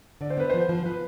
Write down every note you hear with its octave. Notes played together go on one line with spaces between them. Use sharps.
D3 D5
C5
B3 B4
F3 C5
F3
F3 B4